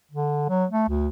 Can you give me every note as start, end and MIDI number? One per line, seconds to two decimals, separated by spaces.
0.11 0.46 50
0.49 0.65 54
0.71 0.88 57
0.89 1.08 38